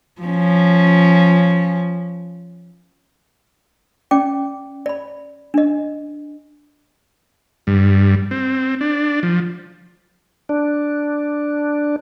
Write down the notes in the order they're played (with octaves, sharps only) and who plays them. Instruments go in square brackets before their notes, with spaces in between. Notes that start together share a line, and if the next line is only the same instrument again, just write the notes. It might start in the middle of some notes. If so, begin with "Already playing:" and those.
[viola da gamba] F3 C#4
[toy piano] C#4 D5 G5 D6
D5 B5
D4 D#5
[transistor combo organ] G2
C4
D4
F3
[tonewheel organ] D4